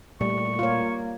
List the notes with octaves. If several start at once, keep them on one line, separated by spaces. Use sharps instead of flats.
A#2 G3 A3 C#6
A#3 F4 C#5